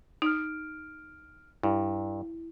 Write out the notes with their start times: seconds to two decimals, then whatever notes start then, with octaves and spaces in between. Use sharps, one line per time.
0.22 D#4 F6 D7
1.63 G2 E4